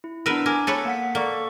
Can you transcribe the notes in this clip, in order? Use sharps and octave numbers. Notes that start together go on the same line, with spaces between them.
E4
B3 D4 A#4 B4 E6
A#4 G#5 D6 G#6
A4 B4 C#5
A#3 F#5 B6
A#3 A4 D5 C#6